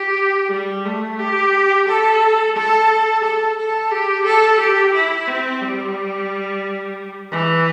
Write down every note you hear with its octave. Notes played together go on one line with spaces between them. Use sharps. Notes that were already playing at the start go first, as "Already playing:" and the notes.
Already playing: G4
G3
A3
G4
A4
A4
A4
A4
G4
A4
G4
E4
C4
G3
E3